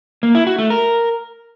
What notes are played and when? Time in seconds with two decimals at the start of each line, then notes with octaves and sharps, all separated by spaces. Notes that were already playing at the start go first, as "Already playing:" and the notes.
0.23 A#3
0.35 E4
0.47 F#4
0.58 A3
0.70 A#4